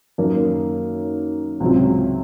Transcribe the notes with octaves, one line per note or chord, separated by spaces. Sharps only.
F#2 D#3 A#3
C#2 C3 F#3 C4 F4